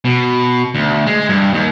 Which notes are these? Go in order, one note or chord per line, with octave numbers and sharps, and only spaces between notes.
B2
D2
G#3
G2
D#2